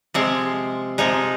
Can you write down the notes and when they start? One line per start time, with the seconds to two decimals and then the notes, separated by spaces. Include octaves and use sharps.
0.14 C3 F3 G#3 C4
0.98 C3 F3 G#3 D#4